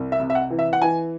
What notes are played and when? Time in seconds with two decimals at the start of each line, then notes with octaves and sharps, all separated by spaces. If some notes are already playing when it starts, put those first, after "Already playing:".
Already playing: C2
0.12 E5
0.20 C3
0.30 E5
0.35 F#5
0.50 E3
0.59 E5
0.73 F#5
0.82 E3 G#5